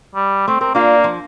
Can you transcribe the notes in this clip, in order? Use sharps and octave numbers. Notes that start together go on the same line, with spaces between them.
G3
A3 C4
C4 A#4
A#3 D4 F4
F3